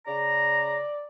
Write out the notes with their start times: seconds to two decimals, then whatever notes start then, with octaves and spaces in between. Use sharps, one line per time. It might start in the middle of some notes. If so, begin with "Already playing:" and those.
0.07 C#3 D5 A#5